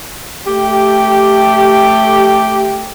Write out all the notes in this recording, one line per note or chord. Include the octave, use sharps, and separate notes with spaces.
A3 G4